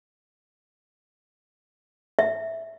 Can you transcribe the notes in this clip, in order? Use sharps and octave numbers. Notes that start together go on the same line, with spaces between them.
E5